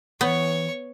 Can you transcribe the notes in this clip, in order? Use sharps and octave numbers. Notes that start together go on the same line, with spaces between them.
E3 B3 C#5 C#6